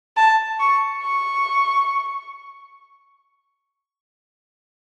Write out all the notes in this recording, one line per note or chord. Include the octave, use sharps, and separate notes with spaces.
A5
C#6
C#6